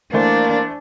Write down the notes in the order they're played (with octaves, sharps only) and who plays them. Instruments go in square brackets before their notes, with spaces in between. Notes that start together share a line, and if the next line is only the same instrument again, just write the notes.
[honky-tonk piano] E3 A3 C5 [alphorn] A#3 [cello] D4